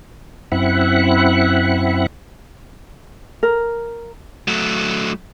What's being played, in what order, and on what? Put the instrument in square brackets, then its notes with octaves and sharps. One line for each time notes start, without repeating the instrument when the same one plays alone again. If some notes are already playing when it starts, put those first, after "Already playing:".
[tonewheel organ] F#2 C4 E4 E5 F#5 F#6
[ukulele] A#4
[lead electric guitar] F#3 A3